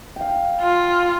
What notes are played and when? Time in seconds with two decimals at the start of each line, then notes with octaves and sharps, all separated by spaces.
0.16 F5 G5
0.61 F4